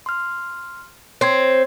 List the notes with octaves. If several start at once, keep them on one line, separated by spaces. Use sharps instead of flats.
C6 F6
C4 C#5 C6 G#6